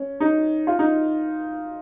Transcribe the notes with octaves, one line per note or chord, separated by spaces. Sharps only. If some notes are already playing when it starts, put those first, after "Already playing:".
Already playing: C#4
D#4
F4
D#4